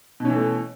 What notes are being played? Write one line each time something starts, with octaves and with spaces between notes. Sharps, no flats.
B2 E3 A3 C#4